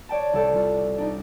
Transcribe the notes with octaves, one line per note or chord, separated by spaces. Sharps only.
C#5 D5 G5 A5
C2 A4 G6
G3 F4
D4 D#4